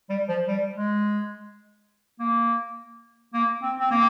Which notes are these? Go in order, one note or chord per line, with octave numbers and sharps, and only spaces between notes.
G3
F3
G3
G#3
A#3
A#3
C4
C4
A#3